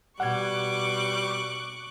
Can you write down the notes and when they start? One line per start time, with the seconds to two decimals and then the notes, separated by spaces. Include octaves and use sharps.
0.20 B2 G3 F#5 C#6 D6 F#6 G#6